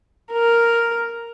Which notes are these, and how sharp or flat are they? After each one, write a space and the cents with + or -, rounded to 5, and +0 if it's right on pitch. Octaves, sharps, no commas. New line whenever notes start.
A#4 +0